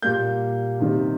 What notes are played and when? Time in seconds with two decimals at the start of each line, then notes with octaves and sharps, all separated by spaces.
0.02 A#2 G3 A#3 G6
0.80 C3 D#3 G3